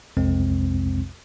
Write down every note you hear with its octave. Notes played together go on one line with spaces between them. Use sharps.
B1 F2 C3 G#3 C4